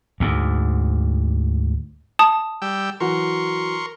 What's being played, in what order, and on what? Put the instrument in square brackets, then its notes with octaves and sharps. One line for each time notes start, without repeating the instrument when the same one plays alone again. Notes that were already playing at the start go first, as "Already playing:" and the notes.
[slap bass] D2 G#2
[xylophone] A5 D#6
[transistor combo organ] G3 G5 E6
[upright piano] E3 F#3 F#4 [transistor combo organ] A#4 C6 C#6